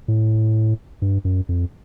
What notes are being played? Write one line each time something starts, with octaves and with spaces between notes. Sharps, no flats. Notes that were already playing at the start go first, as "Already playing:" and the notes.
A2
G2
F#2
F2